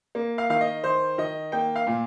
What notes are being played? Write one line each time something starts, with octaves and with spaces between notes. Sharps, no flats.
A#3
F5
D#3 F5
D#5
D#3 C5
D#3 D#5
A#3 G5
F5
A#2